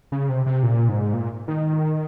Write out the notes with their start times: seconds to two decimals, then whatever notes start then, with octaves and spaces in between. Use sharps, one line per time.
0.12 C#3
0.29 C3
0.46 C3
0.63 A#2
0.89 G#2
1.13 A#2
1.48 D#3